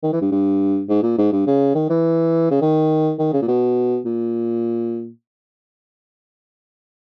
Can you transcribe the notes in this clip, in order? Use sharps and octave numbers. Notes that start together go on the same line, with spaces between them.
D#3
E3
G2
G2
G#2
A#2
G#2
G2
C#3
D#3
E3
C#3
D#3
D#3
C#3
A#2
B2
A#2